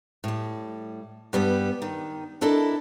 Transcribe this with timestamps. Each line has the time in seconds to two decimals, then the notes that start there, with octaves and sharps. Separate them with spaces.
0.24 A2 G3
1.33 G2 G3 B3
1.82 D#3
2.41 D4 E4 A4 A#4 D5 D#5